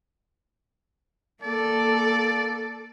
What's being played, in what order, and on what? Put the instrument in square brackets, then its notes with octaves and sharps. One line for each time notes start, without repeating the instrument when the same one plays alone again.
[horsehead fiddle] A#3 A4 [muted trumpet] D5